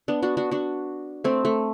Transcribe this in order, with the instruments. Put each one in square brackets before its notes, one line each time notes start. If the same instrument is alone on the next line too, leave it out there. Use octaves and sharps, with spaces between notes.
[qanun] B3 D4
D4 F#4
D4 F#4
D4 F#4
A3 C4
A3